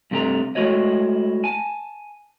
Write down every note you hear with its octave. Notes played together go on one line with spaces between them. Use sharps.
G2 C3 A3 G4 A#5
G#3 A3 E4 F#4 C#5 D#5
G#5 A5